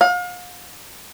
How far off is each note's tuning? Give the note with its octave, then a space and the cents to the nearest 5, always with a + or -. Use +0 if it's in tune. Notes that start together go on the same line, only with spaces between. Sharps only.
F5 +40